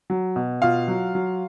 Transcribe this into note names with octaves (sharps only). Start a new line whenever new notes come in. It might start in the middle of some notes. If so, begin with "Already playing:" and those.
F#3
B2
B2 F4 F5
F#3
F#3